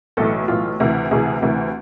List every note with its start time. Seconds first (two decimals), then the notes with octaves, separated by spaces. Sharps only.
0.17 B1 A2 E3 A4
0.48 B1 A2 E3 F4
0.80 D2 C3 E3
1.11 D2 C3 E3 G#4
1.42 D2 C3 E3